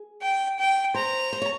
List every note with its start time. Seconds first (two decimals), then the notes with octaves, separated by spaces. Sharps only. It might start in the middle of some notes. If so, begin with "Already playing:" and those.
Already playing: G#4
0.22 G5
0.59 G5
0.94 C5 A#5
1.33 C5
1.42 C#5